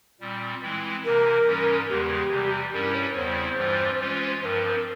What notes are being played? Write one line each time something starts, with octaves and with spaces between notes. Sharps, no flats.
A#2 G3 C4
E3 G#3 C4 E4
C3 E3 A#3 A#4
G#2 E3 G3 C#4
E2 C#3 E3 G#3 G4
C3 E3 G3
G2 G3 C#4 E4 A#4
C#5
E2 C#3 G3 C4 E4 C5
G2 E3 G3 C4 F4
E3 G#3 C#4 F4
G2 F3 C4 A#4 C5